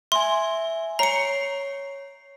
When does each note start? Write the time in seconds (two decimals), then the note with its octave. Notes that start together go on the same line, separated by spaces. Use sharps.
0.12 E5 G#5 C6
0.99 C#5 A#5 C7 C#7